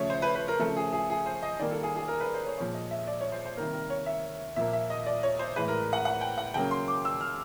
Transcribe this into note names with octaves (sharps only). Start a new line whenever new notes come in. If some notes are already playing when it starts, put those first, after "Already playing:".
Already playing: C#3 F3 A3 C#5
C5
B4
B4
A#4
C#3 F3 A3 A4
G#4
G#4
G#4
C5
D#5
D#3 G3 A#3 D5
A4
G#4
G#4
A#4
B4
C5
C#5
A#2 F3 G#3 C#5
D#5
E5
D5
C#5
C5
C5
C3 D#3 G3 A#3 A#4
A#4
C#5
E5
A#2 F3 A#3 E5
E5
D#5
D5
C#5
C5
A2 E3 G#3 B4
A#4
F#5
F#5
G5
F#5
C#3 F#3 A#3 G5
C6
D6
E6
F6